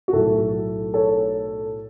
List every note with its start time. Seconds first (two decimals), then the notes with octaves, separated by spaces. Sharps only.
0.08 F#4
0.13 B1 A2 F#3 A3 E4 A4
0.94 A4 C#5